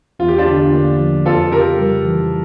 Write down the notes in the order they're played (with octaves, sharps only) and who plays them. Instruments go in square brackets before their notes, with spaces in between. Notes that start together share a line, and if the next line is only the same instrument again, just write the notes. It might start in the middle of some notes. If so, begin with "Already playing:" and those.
[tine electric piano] E2 [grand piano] F4
[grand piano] G4
D4 F4
[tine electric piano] D3
A#3
F3
[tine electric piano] F2 [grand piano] F4 A4
[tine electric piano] C#3 [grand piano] G4 A#4
[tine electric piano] G3
E3